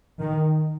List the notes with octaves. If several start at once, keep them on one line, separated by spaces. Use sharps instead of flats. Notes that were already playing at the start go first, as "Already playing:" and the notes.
D#3